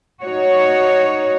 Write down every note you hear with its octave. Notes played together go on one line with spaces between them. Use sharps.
D#4 F#4 C#5